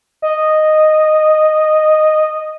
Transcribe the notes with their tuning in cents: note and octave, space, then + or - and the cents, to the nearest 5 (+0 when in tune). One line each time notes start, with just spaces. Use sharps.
D#5 -5